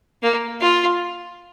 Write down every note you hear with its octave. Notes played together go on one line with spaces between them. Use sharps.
A#3
F4